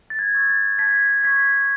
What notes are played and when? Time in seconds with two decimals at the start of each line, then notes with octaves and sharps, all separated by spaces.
0.10 A6
0.19 G#6
0.34 C#6 E6
0.49 A6
0.79 A5 G#6 B6
1.24 C#6 E6 G#6 B6